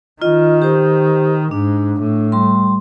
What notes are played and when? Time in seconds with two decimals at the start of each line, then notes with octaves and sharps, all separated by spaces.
0.22 D#3 F4 D#5
0.62 G4 C5
1.51 G#2 D4
2.00 A2
2.32 G3 C6